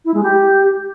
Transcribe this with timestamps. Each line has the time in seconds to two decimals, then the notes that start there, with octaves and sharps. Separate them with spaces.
0.05 E4
0.14 G#3
0.23 G4